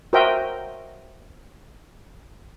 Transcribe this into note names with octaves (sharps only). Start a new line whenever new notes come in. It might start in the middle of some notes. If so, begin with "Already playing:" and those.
F#4 A#4 C5 D#5 E5 G5